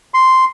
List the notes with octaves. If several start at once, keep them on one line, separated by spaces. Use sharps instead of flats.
C6